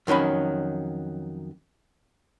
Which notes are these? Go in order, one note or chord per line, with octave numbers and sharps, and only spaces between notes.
F2 D#3 F#3 C#4 B5